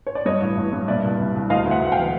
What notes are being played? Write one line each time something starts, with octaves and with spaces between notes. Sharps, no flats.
C#5
D5
G2 C#5 D#5
A1
A1
G2
A#2 D5 E5
C2
C2
C2
D2 D#5 F5
D2
E5 F#5
D2 F#5
F5 G5
E3